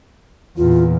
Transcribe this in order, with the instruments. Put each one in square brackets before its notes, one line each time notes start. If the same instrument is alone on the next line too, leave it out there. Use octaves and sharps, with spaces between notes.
[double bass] E2 A#2 [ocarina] F4